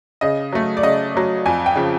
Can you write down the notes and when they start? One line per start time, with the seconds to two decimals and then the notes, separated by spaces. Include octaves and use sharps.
0.21 C#3 D#5
0.53 F#3 A3
0.77 D5
0.83 C#3 D#5
1.15 F#3 A3
1.46 F2 G#5
1.66 G5
1.75 C#3 F3